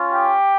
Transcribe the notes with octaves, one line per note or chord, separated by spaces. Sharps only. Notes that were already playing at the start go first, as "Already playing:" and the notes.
Already playing: C#4 F4
G4